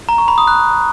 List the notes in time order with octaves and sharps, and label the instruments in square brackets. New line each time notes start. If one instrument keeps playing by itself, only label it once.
[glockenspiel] A#5
C#6
B5
D#6
F#6